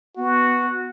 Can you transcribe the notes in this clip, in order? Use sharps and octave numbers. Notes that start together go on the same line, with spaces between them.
B3 F#4